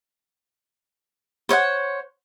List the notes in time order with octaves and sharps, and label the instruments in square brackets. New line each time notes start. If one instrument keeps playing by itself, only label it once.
[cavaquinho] C5 C#5 D#5 F#5